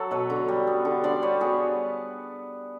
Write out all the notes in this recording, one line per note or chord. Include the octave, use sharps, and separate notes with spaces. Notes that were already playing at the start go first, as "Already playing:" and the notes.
Already playing: F#3 A4
B2 B4 C#5
D3
G3
B3
D3
D3 C5 D5
G3 B4 C#5
B3 F#4 G#4